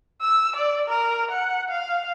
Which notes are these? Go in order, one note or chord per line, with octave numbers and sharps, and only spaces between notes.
E6
D5
A#4
F#5
F5